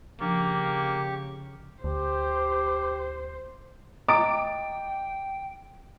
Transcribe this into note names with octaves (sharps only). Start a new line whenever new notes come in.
C#3 F3 A#3 D4 G4 C#6
D2 G4 C5
D#5 G5 A#5 D6 D7